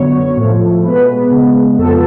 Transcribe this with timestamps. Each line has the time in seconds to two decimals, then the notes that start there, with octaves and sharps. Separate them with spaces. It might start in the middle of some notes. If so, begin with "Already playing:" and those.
Already playing: F#2 D3 F#3 B3 C#5
0.37 A2 F3 A3
0.84 B2 G#3 B3 B4
1.31 C#3 G#3 B3
1.78 F2 F3 B3 A4